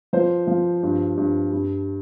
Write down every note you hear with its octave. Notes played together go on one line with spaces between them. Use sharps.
F3 C5
F3
G2
G2
G2